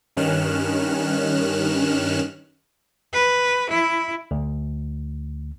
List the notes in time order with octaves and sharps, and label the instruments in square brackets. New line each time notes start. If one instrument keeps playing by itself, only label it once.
[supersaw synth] G2 D#3 C#4 F6 F#6 E7
[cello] B4
E4
[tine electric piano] D2